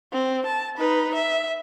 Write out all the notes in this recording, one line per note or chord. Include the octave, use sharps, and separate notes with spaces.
C4
A5
D#4 B4
E5